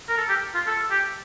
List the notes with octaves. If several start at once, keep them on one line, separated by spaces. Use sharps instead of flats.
A#4
A4
G4
F4
A4
G4